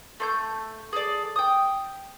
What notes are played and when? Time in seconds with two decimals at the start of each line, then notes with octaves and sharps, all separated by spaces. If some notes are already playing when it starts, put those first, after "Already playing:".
0.20 A3 C6 G6
0.93 G#4 A4 D5
1.36 G5 D#6